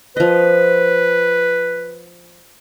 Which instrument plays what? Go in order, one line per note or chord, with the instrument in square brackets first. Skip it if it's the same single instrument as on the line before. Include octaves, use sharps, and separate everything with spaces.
[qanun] F3 D#5 [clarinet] B4